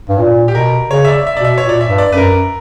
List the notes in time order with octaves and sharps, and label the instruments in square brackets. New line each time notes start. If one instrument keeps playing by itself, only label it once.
[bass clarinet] G2
A#2
[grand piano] G4
[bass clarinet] B2 [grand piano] A#4
[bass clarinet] C#3 [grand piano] C#5
[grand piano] E5
D5
E5
[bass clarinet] B2 [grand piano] D5
[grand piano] E5
C#5
[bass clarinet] A#2
[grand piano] D5
E5
[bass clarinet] G2
[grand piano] D5
[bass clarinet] F#2 [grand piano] B4
[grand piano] A#4